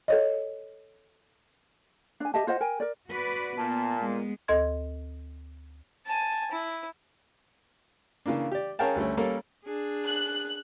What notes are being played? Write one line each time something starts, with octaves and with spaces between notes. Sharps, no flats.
A4 C#5 D#5
D4 G#5
G4 D#5 E5 A5
F4 C5 D#5 F#5
A#4 G5 G#5
A#4 D5
F#4 B4 D5
A#2 B3 A5
G#3 B3
D2 A4 D#5 C6 G#6
G#5 A5
E4
C#3 E3 A#3 D4
G4 D5
C#4 G#4 A#4 F5 G5 A5
D2 G3 A3 C#4
G3 A#3 C#4 A4 A#4
D4 G#4
F#6